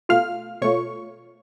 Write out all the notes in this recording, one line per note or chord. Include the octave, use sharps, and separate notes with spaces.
B2 A3 F4 F5 F6
B2 A3 F4 C#5 C#6